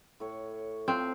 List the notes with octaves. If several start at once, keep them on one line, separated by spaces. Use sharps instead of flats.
A2 C#5
F3 C4 F5 C6